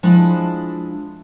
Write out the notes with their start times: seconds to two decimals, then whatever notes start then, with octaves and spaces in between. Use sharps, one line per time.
0.03 F3 G#3 D4 E4 A5